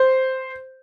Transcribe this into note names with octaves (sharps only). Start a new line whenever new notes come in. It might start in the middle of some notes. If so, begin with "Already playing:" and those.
Already playing: C5